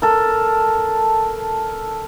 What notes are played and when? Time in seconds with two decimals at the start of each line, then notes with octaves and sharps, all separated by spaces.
0.02 A4 A#4